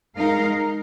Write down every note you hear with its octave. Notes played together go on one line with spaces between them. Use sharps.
G#3 D#4 A#4 F5